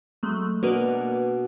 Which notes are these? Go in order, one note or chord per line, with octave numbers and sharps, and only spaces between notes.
F#3 G#3 A3
B2 A#3 D4 A#4 B4 D#5